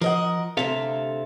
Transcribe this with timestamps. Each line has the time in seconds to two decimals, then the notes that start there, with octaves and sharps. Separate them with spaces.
0.01 F3 A#4 D#5 F#5
0.57 D2 G#2 C3 A4 E5 F5